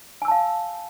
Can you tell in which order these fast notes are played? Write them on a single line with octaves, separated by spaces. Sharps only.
G#5 E6 A5 F5